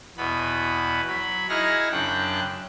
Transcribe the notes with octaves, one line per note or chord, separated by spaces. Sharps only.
E2 B2 B3 B5
F#3 B5
D#4 E4 G#4 F#5 F6 A#6
F#2 C#3 D4 G5 F#6